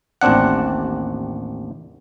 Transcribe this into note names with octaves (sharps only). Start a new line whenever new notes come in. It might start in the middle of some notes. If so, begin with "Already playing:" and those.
A1 D#2 C4 D4 F#5